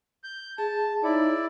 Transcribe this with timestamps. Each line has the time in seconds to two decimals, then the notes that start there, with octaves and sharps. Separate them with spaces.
0.24 G6
0.58 G#4 A5
1.04 D#4 E4 C#5 D5